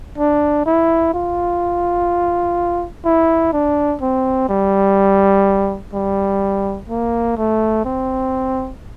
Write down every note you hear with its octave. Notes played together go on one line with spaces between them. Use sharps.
D4
E4
F4
E4
D4
C4
G3
G3
A#3
A3
C4